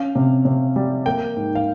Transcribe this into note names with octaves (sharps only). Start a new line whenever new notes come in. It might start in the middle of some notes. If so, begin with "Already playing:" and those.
Already playing: C#4 F5
C3
C3
G3
A#3 G5
G#2
F5